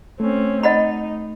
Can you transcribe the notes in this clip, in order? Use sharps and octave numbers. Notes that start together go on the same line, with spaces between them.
A3 C4 C#4
D#4 D#5 F#5 B5